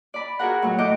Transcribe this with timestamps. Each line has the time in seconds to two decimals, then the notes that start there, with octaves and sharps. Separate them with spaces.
0.14 D5 B5
0.39 F#4 G#4 A#4 F#5
0.62 A2 F#3
0.78 A2 E3 D#5 D6 G6